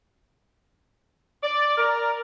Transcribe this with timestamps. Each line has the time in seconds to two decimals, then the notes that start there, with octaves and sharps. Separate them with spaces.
1.43 D5
1.77 A#4